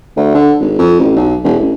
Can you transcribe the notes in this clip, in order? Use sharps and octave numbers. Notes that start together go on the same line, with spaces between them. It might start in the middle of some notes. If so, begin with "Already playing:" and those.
D2
D3
G#1
F2
A1
B1
E1
A1